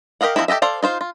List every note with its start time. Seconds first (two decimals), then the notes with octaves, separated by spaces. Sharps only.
0.21 G4 A#4 D#5 F5 F#5
0.36 F3 G3 C4 D#4 E4
0.48 G4 A4 D#5 E5
0.62 A4 C5 D5 F5
0.83 D#4 F4 C5
1.01 F4